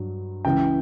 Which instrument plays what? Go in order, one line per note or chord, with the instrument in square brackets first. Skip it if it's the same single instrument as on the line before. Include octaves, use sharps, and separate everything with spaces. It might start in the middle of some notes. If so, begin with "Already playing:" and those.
Already playing: [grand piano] G2 F#3
C#2 C#3 E3 G5